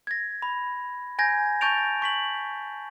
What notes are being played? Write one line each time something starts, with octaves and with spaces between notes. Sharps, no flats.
G#6 A#6
B5
G#5 G6 G#6 A#6
A5 C#6 G6 A6 D7 F7
C#6 B6 F#7